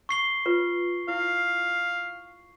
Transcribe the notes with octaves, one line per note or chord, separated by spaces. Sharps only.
C#6 C7 G7
F4 B4
E4 F5